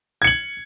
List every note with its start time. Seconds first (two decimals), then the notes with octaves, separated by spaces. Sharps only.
0.22 G#6
0.24 C#7
0.27 F#7